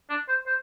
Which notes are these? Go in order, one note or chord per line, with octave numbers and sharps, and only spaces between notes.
D4
C5
C5